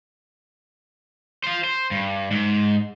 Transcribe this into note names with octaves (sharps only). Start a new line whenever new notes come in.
C5 F5
C5
G2
G#2